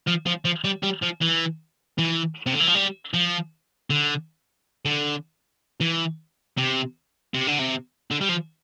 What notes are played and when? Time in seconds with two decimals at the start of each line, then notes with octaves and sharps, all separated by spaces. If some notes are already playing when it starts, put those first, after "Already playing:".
0.08 F3
0.26 F3
0.45 F3
0.64 G3
0.83 G3
1.03 F3
1.21 E3
1.98 E3
2.47 C3
2.53 D3
2.60 E3
2.68 F3
2.75 G3
3.14 F3
3.90 D3
4.85 D3
5.81 E3
6.57 C3
7.34 C3
7.47 D3
7.59 C3
8.11 D3
8.21 G3
8.29 F3